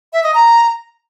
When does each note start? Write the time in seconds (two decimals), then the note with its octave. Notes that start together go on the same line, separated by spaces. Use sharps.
0.13 E5
0.23 D#5
0.34 A#5